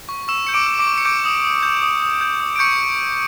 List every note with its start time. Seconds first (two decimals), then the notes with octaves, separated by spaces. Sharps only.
0.09 C#6
0.28 C#6 E6 E7
0.47 G6 C#7
0.54 D6 D7
0.66 E6
0.79 D6 D7
0.87 C#6
0.98 C#7
1.05 D6 G6 D7
1.25 D#6
1.44 D#6
1.63 G6
1.82 D#6
2.02 D#6
2.21 G6
2.40 D#6
2.56 D7
2.59 C#6 G6 C#7